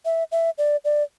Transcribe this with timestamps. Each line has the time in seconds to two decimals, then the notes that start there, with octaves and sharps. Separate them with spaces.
0.05 E5
0.32 E5
0.58 D5
0.85 D5